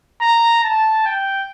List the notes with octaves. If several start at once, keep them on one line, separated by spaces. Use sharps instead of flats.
A#5
A5
G5